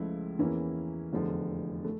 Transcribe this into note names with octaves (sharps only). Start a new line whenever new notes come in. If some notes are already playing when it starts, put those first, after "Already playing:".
Already playing: C#2 C#3 F3 A3 E4
E2 E3 A#3 C#4 E4
F1 E2 D3 F3
A3